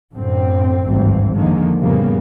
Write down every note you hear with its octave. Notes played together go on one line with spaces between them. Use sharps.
F#2 A2 D3 C4
G#1 D2 G2 E3 C4
F2 D3 D#3 F3 G#3 A#3
F2 A2 C#3 G3 A#3 B3